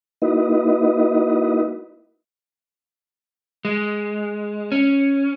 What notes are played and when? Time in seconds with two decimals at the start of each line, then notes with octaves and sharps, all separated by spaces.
0.22 A#3 D#4 E4 F#4 B4 D#5
3.65 G#3
4.72 C#4